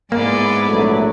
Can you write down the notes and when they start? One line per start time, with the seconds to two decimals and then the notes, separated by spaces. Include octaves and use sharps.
0.12 G#2 G#3 A#3 B3 E4 D5
0.66 A#1 F#3 A3